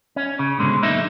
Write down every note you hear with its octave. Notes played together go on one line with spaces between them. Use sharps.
C#4
C#3
G#2 B2 D3 G#3
B1 D3 A#3 D#4 E5